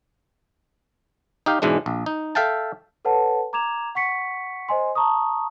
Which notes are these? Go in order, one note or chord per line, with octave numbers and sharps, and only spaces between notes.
D#4 G4 F5
G#2 B2 E3 G#3 D4
A#1
D#4
A4 E5 F5 G5 A5
A4 B4 C#5 F#5 A5
A#5 D6 G#6 E7 F7
F#5 C#6 B6 C#7
C5 D#5 G#5 C6
A5 A#5 C#6 D#6